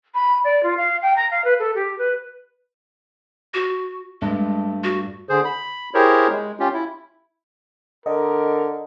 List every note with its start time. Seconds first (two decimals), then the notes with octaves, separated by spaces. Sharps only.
0.14 B5
0.44 D5
0.63 F4
0.77 F5
1.02 G5
1.16 A#5
1.30 F5
1.44 B4
1.59 A4
1.75 G4
1.98 B4
3.54 F#4
4.22 G2 G#3 A3 A5
4.84 F#4
5.29 D3 G#4 C5
5.45 B5
5.94 E4 G4 G#4 A#4 C5 C#5
6.30 G#3
6.60 C#4 F4 G4
6.74 E4
8.06 D3 A#4 D#5